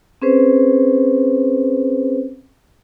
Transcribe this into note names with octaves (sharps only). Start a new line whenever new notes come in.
C4 C#4 G#4 B4 C5